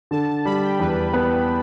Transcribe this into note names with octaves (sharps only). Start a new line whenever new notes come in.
D3 A5
A5
G3 B5
G5
E2 B4
B3